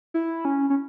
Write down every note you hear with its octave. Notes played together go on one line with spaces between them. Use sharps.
E4
C#4
C#4